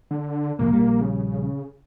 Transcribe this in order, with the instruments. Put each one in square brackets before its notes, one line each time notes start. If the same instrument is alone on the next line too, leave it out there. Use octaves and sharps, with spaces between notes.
[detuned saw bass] D3
[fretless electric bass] C2 F2 A2 [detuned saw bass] A#3
[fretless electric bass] A#1 G3
[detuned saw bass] C#3